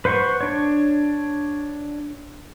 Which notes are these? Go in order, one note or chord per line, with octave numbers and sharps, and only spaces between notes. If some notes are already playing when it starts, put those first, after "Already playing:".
B4 C5 F#5 C6 C#6
D4 C#5